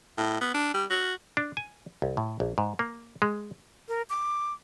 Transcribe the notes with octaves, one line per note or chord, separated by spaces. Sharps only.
A2
B3
D4
G3
F#4
D4
G#5
C2
A2
A#1
G#2
A#3
G#3
A#4
D6